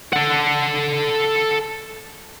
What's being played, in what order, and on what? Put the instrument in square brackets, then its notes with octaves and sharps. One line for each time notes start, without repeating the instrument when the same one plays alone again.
[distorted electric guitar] A4 F#5